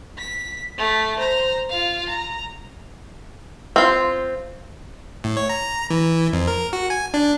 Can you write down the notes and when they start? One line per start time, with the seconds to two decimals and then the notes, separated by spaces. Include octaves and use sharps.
0.18 B6
0.78 A3 B6
1.19 C5 A#5
1.70 F4 F5
2.09 A#5
3.76 C4 F4
5.24 A2
5.37 C#5
5.49 A#5
5.90 E3
6.33 F2
6.48 A#4
6.73 F#4
6.90 G#5
7.14 D4